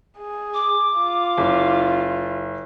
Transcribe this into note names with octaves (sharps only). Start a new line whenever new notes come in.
G#4
D6
F4
F#1